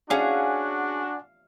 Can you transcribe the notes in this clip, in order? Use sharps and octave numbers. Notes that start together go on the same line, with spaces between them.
C#4 D4 F#4 G#4 D5 F5 F#5 G#5